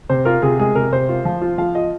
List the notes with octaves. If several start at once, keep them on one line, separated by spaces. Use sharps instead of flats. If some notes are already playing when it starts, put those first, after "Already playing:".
C3 C5
F4 A#4
C3 G#4
G#3 G#4
C3 A#4
C3 C5
F4
F3
F4
F3 F5
F4 D#5